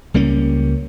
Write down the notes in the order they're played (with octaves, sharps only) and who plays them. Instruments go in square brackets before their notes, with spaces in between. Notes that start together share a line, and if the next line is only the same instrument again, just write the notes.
[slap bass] C#2 G3 A#3 C#4